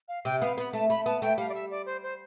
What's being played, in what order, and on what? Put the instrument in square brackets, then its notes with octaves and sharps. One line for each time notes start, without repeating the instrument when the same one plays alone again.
[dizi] F5
[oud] C3 [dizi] G5
[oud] B3 [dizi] F5
[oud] B3 [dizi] B5
[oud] A3 [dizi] A5
[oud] A3 [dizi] B5
[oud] B3 [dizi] A5
[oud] A3 [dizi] G5
[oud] G3 [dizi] F5
[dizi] D5
E5
D5
C5
C5